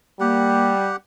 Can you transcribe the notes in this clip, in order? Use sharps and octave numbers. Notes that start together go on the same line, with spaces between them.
G3 A#3 G4 F#5